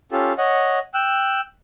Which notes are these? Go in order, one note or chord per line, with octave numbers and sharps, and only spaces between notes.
C#4 F4 G4 A4
C#5 D#5 F#5
G5 E6 F#6